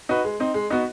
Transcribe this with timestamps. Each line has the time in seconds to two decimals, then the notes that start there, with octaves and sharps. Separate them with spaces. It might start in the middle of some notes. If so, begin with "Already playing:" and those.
0.09 D#4 F#4 B4
0.24 G#3
0.40 C4 D#4
0.54 G#3
0.70 B3 D#4 F#4